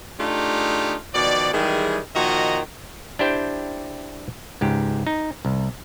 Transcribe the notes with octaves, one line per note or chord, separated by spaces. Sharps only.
A3 D4 D#4 F4 G4 G#4
B2 D#3 F3 D5
D#3 E3 G3 G#3 G#4
A#2 D#3 F3 F#4 D#5 A#5
D4 E4 G4 C5 G5
C#2 G#2 G4
D#4
C2